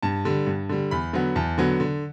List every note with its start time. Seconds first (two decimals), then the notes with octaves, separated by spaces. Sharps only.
0.03 G2 A5
0.25 D3 G3
0.46 G2
0.69 D3 G3
0.91 E2 B5
1.13 D3 F#3 B3
1.36 E2 A5
1.58 D3 F#3 B3
1.80 D3